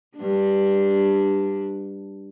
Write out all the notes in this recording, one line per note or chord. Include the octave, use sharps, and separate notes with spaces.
G2 D4